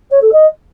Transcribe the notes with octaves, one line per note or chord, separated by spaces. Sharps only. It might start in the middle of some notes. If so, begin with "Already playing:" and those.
C#5
A4
D#5